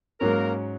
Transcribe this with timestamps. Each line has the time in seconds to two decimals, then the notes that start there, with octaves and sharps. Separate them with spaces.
0.20 G#2 F#3 A#3 C#4 A#4